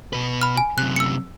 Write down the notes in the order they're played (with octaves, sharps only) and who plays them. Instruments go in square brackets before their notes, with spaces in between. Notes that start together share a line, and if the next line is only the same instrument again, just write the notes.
[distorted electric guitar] B2 B4
[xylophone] B5 F6
G#5
[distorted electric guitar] F#2 C3 [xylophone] F#6
[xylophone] E6 C#7